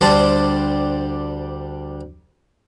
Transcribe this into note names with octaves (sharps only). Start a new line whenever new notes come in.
D2 G3 D4 C5 A5